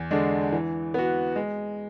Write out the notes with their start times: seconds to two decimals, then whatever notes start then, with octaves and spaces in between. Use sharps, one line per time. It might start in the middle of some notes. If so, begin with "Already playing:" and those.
Already playing: E2
0.11 D3 G#3 D4
0.52 E3
0.94 B3 F#4
1.36 G#3